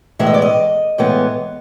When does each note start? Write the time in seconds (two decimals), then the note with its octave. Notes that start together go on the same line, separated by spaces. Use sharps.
0.19 A2 E3 G#3 B3 E5
0.27 D#5
0.34 D5
0.42 D#5
0.98 A2 E3 G#3 B3